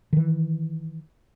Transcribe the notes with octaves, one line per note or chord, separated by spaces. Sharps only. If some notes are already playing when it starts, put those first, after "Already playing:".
D#3 E3